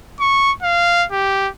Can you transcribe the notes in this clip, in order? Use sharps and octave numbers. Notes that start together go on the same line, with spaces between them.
C#6
F5
G4